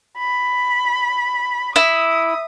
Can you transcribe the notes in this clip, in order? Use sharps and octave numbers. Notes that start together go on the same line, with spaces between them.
B5
E4 D#6